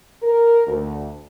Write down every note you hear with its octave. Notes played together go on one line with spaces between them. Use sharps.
A#4
D2